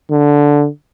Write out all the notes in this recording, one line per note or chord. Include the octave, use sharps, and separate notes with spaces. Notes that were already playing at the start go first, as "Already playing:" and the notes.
D3